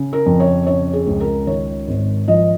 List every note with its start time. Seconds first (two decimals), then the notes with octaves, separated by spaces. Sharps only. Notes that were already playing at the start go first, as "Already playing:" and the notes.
Already playing: C#3
0.13 A#4
0.26 F2
0.40 C#5
0.67 C#3 C#5
0.93 G#4
1.07 C#2
1.20 A#4
1.47 D#3 C#5
1.88 G#1
2.28 F3 D#5